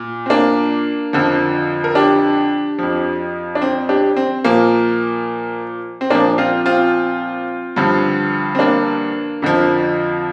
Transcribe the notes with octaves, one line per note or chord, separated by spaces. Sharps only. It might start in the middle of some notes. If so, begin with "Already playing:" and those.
Already playing: A#2
C4
A#3 D4
F2 D3 F3
A#4
D4 G4
F2 F3
D4
C4
D4 G4
C4
A#2 F3 A#3
C4
A#2 F3 A#3 D4
C4 F4
C4 F4
G2 D3 F3
C4
A#3 D4
F2 D3 F3